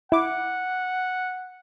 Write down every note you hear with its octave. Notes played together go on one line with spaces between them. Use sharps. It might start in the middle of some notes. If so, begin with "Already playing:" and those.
E4 F#5 D6